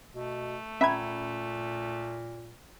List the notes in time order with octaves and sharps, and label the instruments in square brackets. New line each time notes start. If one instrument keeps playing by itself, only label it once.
[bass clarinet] B2 [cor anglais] A3
[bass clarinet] A#2 [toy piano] C#4 A#5 B5 [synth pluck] E5 G#6